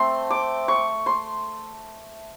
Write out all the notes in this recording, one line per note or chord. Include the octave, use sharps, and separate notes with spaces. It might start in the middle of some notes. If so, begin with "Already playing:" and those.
Already playing: A3 C4 C6
D6
C#6
C6